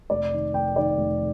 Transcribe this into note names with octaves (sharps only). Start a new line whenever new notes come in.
F1 D5
D#3
F1 G5
D#3 D5
F1